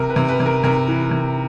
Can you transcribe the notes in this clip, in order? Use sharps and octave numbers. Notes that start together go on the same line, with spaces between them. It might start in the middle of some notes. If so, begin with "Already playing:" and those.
Already playing: C3 A#4
B4
C3
B4
C3
A#4
C3 A#4
E3
C3